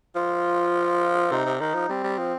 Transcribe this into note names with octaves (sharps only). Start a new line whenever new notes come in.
F3 F4
C3 D#4
C3
D#3 D#4
F3
G3 C4
G3
F3